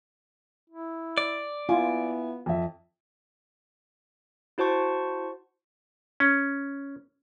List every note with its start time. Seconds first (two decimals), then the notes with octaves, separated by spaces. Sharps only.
0.70 E4
1.18 D5
1.69 B3 E4 F4 G#5
2.46 F2 E5
4.58 E4 F#4 C5 A5 C#6
6.20 C#4